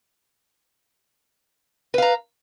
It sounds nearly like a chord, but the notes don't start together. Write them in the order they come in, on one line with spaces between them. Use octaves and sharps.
B4 F5 A#5